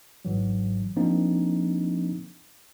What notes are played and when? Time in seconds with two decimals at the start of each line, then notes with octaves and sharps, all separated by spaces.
0.25 G#1 G#2 E3 F#3
0.96 F3 A#3 C4 D4 D#4